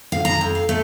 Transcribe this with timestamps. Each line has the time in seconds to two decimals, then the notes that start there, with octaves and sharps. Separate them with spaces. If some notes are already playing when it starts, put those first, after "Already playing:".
0.12 F5
0.25 A#5
0.41 F2
0.55 F5
0.69 A3